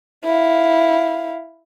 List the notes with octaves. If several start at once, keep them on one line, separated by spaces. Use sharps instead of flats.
E4 F5